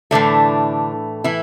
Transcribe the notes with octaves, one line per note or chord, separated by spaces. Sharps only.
A2 D3 E3 A3 D4
E3 E4